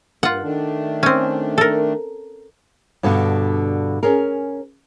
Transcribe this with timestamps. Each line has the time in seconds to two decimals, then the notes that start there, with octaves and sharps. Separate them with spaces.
0.23 G2 F4 F#5
0.42 D#3 A3 D4
1.03 C4 C#4
1.58 A4 A#4
3.03 G2 B2 D3 B3
4.03 C#4 G#4 A#4